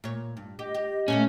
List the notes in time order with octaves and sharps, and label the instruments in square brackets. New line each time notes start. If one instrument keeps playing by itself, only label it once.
[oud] A#2 C#5
G2
[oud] G4 [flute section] D#5
[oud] G4
[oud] A#2 A3 D4 [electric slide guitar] C#4